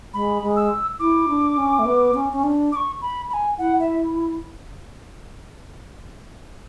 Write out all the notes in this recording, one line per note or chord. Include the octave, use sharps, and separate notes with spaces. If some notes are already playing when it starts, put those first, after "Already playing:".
G#3 B5
G#3
E6
E4 D6
D4
C#4
A3
B3
C#4
C#4
D4
D6
C#6
B5
B5
G#5
E4 F#5
E5